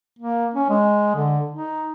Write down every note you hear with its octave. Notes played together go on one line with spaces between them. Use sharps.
A#3
C#4
G#3
D3
D#4